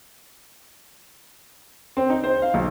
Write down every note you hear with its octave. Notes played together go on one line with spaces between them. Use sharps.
C4
D#4
C5
F5
B1